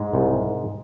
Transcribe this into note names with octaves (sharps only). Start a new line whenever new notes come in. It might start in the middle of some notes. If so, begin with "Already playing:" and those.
Already playing: G#2 G#3
C2